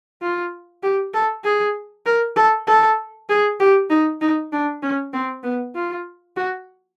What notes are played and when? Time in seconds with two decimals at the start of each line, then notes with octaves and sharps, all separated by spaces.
0.22 F4
0.83 G4
1.14 A4
1.44 G#4
2.06 A#4
2.36 A4
2.67 A4
3.30 G#4
3.60 G4
3.90 D#4
4.21 D#4
4.52 D4
4.83 C#4
5.13 C4
5.44 B3
5.75 F4
6.37 F#4